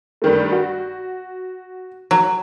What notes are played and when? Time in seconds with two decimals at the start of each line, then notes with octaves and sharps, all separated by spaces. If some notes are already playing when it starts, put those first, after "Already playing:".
0.22 G2 D#3 A3
0.52 F#4
2.11 F#3